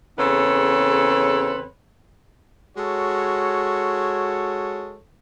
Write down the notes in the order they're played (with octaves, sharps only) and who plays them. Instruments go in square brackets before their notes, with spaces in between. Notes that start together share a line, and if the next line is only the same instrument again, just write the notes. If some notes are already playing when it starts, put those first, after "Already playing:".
[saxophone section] E2 C#3 C4 A4 B4 C#5
[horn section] G#3 F#4 A4 C#5